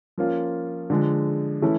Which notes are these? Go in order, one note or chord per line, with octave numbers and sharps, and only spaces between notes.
F3 A#3 C#4 F4
D3 F3 G#3
E3 A3 C#4 E4